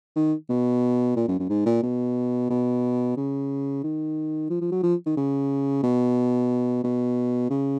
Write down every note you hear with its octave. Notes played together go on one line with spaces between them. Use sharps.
D#3
B2
A#2
F#2
F#2
G#2
A#2
B2
B2
C#3
D#3
F3
F3
F#3
F3
D#3
C#3
B2
B2
C#3